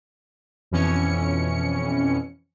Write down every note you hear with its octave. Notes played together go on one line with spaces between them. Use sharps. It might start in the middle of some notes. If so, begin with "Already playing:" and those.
F2 B2 E3 C#4 C#7